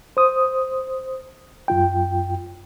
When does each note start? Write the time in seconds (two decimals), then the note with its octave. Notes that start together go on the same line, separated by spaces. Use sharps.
0.17 C5 D#6
1.68 F#2 F4 G5